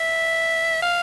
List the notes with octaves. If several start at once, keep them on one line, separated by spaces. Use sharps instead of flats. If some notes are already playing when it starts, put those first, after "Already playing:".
Already playing: E5
F5